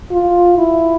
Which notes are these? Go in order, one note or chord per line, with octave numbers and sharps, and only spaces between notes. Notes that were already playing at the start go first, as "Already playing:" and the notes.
F4
E4